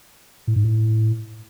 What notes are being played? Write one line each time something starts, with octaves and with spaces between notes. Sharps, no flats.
A2
G#2
A2